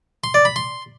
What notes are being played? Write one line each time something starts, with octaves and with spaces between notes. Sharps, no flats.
C6
D5
B5
C6